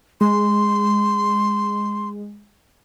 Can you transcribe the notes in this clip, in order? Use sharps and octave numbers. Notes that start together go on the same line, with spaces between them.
G#3 C6